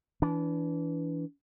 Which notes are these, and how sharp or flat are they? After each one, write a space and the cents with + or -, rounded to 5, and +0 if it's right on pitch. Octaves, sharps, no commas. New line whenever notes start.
E3 +0 D4 -30